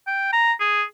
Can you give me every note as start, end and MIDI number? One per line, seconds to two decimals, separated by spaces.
0.07 0.31 79
0.33 0.53 82
0.61 0.83 68